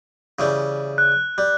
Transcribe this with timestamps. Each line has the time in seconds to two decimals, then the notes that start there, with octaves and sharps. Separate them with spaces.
0.39 C#3 E3 G3
0.98 F#6
1.38 G3